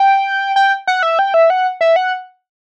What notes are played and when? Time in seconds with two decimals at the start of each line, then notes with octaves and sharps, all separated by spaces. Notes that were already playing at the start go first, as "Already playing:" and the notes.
Already playing: G5
0.56 G5
0.87 F#5
1.03 E5
1.19 G5
1.34 E5
1.50 F#5
1.81 E5
1.96 F#5